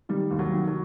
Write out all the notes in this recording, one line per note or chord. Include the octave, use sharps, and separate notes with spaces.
D#3 G3
D#2
F#3
D#3
F#3